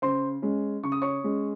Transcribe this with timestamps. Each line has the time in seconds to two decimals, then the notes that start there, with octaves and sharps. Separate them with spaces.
0.02 C#3 C5 C6
0.42 G#3 C#4
0.83 C#3 C#6
0.92 D#6
1.02 C#5 C#6
1.24 G#3 C#4